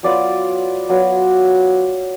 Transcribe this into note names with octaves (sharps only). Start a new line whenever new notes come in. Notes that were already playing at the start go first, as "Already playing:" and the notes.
F#3 B3 F4 D5
F#3 B3 F4